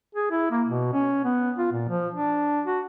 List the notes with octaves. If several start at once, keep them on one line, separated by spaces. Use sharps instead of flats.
G#4
E4
A#3
B2
C#4
B3
F4
A#2
F3
D4
F#4